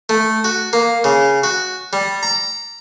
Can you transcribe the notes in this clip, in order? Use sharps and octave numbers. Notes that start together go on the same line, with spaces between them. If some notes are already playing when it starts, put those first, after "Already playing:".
A3
F#4
A#3
C#3
F#4
G3
A#5